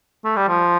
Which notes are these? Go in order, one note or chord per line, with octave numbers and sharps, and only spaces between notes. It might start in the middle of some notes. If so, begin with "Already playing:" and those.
A3
G3
F3